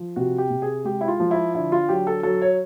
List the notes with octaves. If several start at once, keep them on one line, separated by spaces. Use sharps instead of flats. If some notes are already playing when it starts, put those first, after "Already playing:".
Already playing: F3
C3 F#4
G4
C3
G#4
G#3 G4
E4
F4
F3
E4
D3 E4
F4
F#3 G4
A4
F#3 A4
C#5